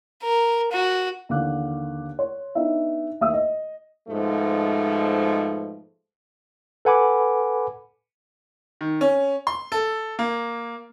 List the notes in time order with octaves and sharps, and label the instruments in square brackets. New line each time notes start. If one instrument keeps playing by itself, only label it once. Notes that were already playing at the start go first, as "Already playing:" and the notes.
[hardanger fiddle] A#4
F#4
[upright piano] D#2 D3 E3 F5 D6 F#6
C#5 C6
B3 D4 D#4 E5
D#2 E5 D#6 E6
D#5
[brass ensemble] G#2 B2 F3 A3
[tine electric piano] A4 B4 F#5 G#5 B5 D6
[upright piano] D#3
C#4
C6
A4
A#3